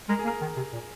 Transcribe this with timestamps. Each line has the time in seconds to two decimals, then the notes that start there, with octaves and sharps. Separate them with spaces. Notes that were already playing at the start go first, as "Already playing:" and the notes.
0.09 G#3 A#4
0.19 G#4
0.25 A#3
0.28 A#4
0.41 D#3
0.57 C3
0.73 A#2